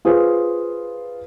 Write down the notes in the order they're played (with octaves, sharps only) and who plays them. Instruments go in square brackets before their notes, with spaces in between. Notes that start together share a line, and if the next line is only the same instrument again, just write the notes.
[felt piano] F4 G#4 B4 C5